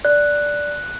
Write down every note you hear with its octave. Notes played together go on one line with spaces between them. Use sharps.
D5 F#6